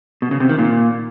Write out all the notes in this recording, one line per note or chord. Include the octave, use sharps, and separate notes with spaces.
B2
C#3
C3
D#3
A#2